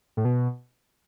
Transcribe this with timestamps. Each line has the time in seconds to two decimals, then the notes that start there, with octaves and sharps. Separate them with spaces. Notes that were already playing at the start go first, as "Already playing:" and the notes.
0.17 A2
0.25 B2